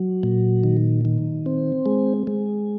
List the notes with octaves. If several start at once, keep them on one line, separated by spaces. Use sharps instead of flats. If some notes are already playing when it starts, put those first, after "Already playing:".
Already playing: F#3
A#2
D#3
D#3
C4
G#3
G#3